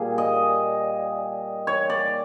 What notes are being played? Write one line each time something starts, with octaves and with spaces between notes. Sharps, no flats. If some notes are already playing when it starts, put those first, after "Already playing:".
Already playing: A#2 G3 G#4
D#5
C#5
D5